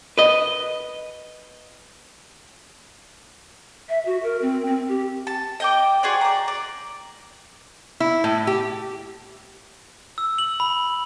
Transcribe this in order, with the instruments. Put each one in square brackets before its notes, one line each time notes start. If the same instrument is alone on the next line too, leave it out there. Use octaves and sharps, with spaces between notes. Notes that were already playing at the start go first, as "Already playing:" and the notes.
[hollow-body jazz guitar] B4 D#5
[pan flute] E5
F#4
A#4
C4
C4
G4
[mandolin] A5
D#5 G5 D6
F#4 G#4 C5 D5
D5 A#5
D5
[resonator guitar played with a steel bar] E4
A2
G4
[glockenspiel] E6
F#7
B5